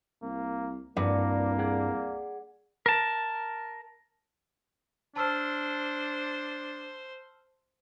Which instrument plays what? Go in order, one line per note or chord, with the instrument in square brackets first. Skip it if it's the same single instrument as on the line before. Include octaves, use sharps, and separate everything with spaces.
[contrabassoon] C2 [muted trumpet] A#3
[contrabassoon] C2 [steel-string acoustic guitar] G2 [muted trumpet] A#3 [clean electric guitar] F#4 B4 D5
[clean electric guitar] G#4 D5 F#5
[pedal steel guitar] A#4 A5
[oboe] D4 [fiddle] C5 [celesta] A5 E6 F6